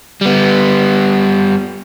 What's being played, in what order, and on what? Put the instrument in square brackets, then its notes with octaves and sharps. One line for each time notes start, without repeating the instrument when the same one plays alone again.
[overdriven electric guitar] G3 B3